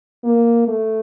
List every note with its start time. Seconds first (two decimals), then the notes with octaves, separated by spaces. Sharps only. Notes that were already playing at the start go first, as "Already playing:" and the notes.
0.24 A#3
0.68 A3